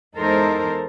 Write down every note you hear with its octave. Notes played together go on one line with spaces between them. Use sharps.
E2 G#3 D#4 A4 A#4 C5